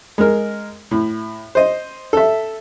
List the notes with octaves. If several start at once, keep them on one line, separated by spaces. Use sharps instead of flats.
G#3 A#4
A2
C5 D#5
A4 E5